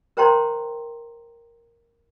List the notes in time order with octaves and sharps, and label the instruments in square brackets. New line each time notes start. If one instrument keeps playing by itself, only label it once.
[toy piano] A#4 C5 C#5 G5 A#5 C6